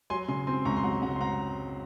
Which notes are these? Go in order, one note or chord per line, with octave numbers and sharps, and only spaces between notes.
F#3 G#5 C6
C#3 G#5 C6
C4 G#5 C6
C#2 A#5 C#6
C6
F#3 F#5 A#5
C#3 F#5 A#5
C6
C4 F#5 A#5